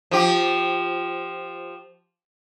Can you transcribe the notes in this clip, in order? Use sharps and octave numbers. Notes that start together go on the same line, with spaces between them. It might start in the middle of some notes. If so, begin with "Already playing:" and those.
F3 G4